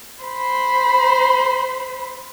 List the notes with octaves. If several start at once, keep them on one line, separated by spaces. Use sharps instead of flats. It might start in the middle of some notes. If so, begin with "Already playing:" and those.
C5 B5